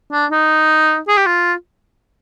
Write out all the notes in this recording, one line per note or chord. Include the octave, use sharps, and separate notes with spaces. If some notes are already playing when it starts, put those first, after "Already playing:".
D4
D#4
G#4
G4
F4